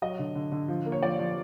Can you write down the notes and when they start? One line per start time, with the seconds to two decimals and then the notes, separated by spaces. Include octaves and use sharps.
0.02 F#3 D#5
0.19 D3
0.35 D3
0.52 D3
0.68 F3
0.86 A#3
0.92 C#5
1.02 F3 D5
1.19 F3